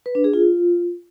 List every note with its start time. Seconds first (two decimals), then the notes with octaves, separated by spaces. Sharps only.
0.06 B4
0.15 D4
0.24 G#4
0.34 F4